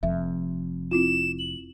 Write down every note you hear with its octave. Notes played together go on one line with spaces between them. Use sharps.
F1 F2 E5
C4 E4 F4 E7
F#7